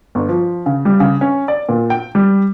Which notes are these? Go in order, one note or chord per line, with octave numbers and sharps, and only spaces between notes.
G1
F3
C#3
G3
C#3
C#4
D5
A#2
G5
G3